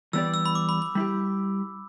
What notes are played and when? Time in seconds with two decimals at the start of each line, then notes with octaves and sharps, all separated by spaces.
0.13 E3 G3 B3 G4 D5 E6
0.34 E6
0.46 B5
0.55 D6
0.69 B5
0.82 B5
0.95 G3 E4 G4